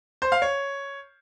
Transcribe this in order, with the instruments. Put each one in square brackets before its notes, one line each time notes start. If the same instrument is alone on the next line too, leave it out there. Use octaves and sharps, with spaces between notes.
[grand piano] C5
F5
C#5